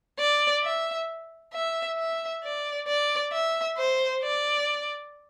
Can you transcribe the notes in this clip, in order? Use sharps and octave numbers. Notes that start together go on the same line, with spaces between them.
D5
E5
E5
E5
D5
D5
E5
C5
D5